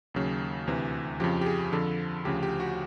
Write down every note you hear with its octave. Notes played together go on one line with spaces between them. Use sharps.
D#2 C#3 F#3
D2 C3 E3
F2 C#3 F3 G4
G4
G#4
F2 D3 F3 A4
D2 C#3 F3 G4
G4
F#4